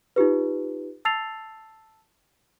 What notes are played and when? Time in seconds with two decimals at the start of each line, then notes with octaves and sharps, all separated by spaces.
0.16 D#4 F4 G4 B4
1.05 A5 E6 A6 C7 F7